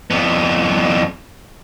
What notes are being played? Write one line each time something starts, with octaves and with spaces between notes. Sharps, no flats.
F2 B3